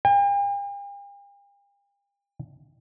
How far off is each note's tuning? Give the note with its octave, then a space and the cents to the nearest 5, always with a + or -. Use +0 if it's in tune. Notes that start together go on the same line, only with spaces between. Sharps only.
G5 +45